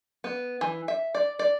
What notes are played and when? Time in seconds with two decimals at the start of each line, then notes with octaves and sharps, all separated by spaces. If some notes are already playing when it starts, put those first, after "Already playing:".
0.24 B3
0.61 E3
0.88 E5
1.15 D5
1.39 D5